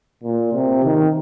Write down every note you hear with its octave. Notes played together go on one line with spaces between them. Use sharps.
A#2
C3
D#3